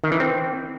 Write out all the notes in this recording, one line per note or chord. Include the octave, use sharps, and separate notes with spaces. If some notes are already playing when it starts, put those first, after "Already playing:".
D#3
E3
C4